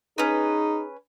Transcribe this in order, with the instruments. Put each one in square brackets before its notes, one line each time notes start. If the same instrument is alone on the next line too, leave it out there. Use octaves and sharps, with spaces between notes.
[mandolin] C#4 B4 [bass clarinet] D#4 [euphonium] G#4